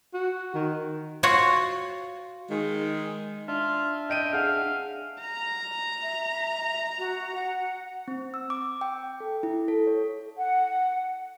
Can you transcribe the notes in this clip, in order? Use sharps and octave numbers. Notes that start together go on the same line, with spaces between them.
F#4
D#3
F4 F#4 C#5 F#5
D#3 G#3
D4 F4 E5
D#5 G5 D7 D#7
G#4 F5 F#5
A#5
E5
F#4
F#5
C4
E6
D6
G5
A4
E4
A4
C#5
F#5